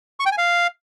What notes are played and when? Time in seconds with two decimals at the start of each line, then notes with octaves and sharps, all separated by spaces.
0.20 C#6
0.26 G5
0.32 G#5
0.38 F5